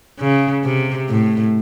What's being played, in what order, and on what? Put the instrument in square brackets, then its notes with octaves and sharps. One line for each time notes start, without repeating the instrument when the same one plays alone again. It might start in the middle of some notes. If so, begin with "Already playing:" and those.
[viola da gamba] C#3
C3
A2